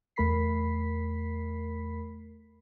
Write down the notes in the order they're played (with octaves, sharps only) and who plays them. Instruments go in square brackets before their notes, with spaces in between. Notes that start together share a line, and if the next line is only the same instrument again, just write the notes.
[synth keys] E2 A3 A#4 B5 B6 C7